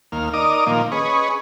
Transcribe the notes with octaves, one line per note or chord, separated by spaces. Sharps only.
D#2 A#3 F6
D#4 A#4 D5 D#5 D6 D#6
A#2 D#3 F3 A#3
C#4 G#4 B4 D#5 C#6